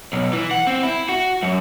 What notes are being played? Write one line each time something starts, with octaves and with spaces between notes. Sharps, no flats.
B1
E3
F#5
C4
E4
F#4
F#2